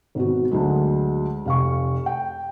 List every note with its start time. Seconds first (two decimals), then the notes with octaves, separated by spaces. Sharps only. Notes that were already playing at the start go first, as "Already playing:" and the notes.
0.15 G#1 B2 F#4
0.51 D2 F#3 G#3
1.46 F1 F5 C#6
2.06 G5